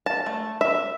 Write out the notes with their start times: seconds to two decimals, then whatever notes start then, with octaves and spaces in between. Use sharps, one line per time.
0.06 A5
0.26 A3
0.61 E5